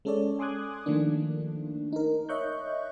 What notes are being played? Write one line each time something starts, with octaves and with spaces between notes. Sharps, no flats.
G#3 C#4 A4 C#5 D5
G#5 C6 D6 D#6 F#6 G#6
D#3 F3 A3 A#3 D4
D#4 A#4
C#5 D#5 E5 C#6 F#6 G6